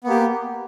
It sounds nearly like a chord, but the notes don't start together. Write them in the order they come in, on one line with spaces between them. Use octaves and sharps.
B3 A#3 G4